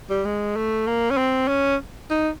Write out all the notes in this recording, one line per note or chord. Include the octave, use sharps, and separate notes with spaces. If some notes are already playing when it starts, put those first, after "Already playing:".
G3
G#3
A3
A#3
C#4
C4
C#4
D#4